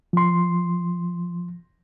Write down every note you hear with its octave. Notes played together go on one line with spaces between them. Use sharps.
F3 C6